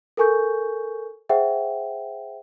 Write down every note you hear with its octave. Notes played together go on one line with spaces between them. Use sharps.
A4 A#4 G#5 C#6 G6
G#4 C5 E5 F#5 G5